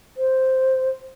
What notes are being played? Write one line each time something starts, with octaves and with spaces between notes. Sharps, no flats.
C5